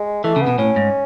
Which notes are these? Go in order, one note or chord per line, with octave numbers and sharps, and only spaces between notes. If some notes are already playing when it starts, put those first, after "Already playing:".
Already playing: G#3
E3 A3
C#3
B3
B2
A2 C#4
G#2